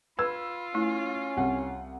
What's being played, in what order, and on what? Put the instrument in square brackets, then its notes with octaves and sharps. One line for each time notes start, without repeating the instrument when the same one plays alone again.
[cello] F4 [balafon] B4 [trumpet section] B5 [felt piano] E6
[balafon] A3 E4 [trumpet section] C#4
[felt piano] C2 F#5